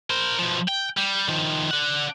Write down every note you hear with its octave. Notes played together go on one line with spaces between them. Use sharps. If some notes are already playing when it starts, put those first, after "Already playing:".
A#4 C5
B2 F3
G5
G3
D#3 F3
D4 F#5